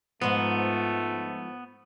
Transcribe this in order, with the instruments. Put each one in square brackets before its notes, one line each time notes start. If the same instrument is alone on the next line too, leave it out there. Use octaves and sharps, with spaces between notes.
[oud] G#2 F3 [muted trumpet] A3 [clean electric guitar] B3